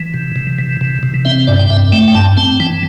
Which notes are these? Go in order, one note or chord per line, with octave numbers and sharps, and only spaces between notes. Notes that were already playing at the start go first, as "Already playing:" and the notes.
Already playing: E3
C3
C3
E3
C3
C3
C4 E5
G2 D5
G5
G2 E5
A3 G5
G5
G2 A5
C4 A5
E3 G5